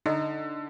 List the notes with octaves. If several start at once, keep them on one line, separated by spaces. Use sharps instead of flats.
D3 D#4